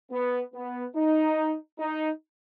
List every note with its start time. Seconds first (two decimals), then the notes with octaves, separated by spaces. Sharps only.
0.11 B3
0.54 B3
0.95 D#4
1.79 D#4